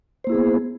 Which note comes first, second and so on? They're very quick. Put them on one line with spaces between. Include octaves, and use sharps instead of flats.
C5 A#3 E4 G#4 B3